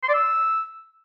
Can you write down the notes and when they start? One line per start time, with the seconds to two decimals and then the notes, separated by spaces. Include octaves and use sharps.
0.03 C6
0.08 D5
0.14 E6